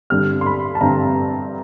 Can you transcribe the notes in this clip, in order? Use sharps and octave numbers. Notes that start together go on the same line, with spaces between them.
G2 D3 G3 C4 F6
C6
B5
A5
G2 D3 G3 C4 A#5